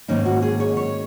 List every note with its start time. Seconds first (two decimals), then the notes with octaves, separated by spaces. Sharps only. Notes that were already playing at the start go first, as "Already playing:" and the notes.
0.08 G#2 D#3 A#3 C#4 D#4
0.25 F#4
0.42 G#4
0.60 C#5
0.77 C#5